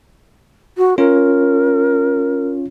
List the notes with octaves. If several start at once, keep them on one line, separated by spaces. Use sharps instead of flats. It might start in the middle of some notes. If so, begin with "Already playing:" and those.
F#4
C#4 F4 A#4 C#5